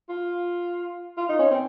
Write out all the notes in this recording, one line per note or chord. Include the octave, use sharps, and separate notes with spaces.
F4
F4
D#4
C#4
C4